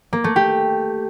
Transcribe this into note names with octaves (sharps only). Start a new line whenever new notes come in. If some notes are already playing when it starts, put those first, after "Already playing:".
A#3
A3
G4